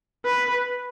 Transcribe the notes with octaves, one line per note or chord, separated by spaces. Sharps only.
B4